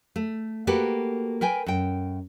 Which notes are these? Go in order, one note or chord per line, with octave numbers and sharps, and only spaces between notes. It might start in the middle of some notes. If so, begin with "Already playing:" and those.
A3
A#3 F#4 G4 A4 B4
A#4 B4 G5 G#5
F#2 G5